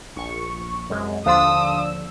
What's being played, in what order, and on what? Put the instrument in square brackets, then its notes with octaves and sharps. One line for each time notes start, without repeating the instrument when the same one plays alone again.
[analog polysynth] A#1 C#6
F#2 C3 G#3
[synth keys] D#2 D3 F3 [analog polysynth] D4 E6 [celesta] F5 C6 [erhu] D#6